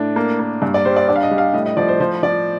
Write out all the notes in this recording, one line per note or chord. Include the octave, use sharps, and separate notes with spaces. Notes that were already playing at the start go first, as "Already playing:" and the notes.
Already playing: A2 D4
A#3
A#3
G2
D5
G3 C5
D5
D4 D5
F5
D#5
G3
F5
A2 D#5
D#5
F3 D5
C5
F3 C5
F3 D5